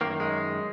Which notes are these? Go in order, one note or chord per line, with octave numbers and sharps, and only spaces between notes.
F#2 D#3 A#3
G#3